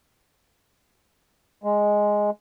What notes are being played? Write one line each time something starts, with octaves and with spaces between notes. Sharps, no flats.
G#3